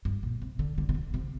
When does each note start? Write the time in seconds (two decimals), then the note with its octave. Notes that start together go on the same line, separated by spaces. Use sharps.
0.05 G2
0.23 A#2
0.42 C3
0.59 D3
0.78 D3
0.89 C3
0.95 D3
1.14 C3